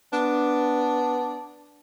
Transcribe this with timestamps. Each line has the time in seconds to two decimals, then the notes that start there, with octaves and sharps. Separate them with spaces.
0.13 B3 D4